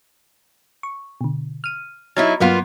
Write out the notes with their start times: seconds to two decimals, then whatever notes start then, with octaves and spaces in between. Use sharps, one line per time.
0.83 C#6
1.21 B2 D3
1.64 F6 D#7
2.17 F#3 D#4 E4 F6 G#6 A6
2.40 G2 F#3 A#3 B3 F4